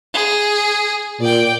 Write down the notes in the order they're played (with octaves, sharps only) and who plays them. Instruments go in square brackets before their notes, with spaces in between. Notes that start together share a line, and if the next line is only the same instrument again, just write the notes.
[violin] G#4
[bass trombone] A#2 [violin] D5 G5